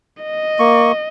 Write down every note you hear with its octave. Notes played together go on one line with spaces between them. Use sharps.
D#5
A#3 C#6